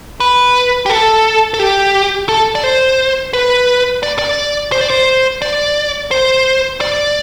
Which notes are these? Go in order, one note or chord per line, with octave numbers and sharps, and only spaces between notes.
B4
G4
A4
A4
G4
A4
D5
C5
B4
D5
D5
C5
D5
C5
D5
C5
D5